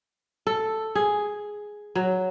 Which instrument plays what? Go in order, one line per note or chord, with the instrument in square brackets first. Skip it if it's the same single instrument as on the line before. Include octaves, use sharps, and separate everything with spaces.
[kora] A4
G#4
F#3